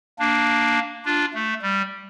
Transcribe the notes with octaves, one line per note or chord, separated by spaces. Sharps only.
A#3 D4
D4 F4
A3
G3